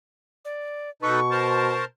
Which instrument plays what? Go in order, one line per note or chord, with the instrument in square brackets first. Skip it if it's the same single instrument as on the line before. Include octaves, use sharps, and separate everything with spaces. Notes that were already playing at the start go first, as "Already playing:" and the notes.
[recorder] D5
[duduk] B2 [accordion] D#4 A4 B4 [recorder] C#6
[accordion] A#4 C5 A5